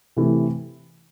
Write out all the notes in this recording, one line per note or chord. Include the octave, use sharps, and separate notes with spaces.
C3 E3 A3